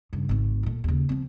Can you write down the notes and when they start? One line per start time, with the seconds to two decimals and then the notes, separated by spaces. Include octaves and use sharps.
0.13 G2 C#3
0.29 G#1 A3
0.63 A#2 A3
0.84 D#2 C#3
1.09 F3 C4